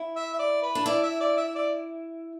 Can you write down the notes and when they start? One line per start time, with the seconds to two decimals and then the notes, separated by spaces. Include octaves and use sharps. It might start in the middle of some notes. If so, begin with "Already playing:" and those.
Already playing: E4
0.16 E5
0.33 E5
0.39 D5
0.62 B4
0.75 D4
0.86 E4 D5
1.03 E5
1.20 D5
1.37 E5
1.55 D5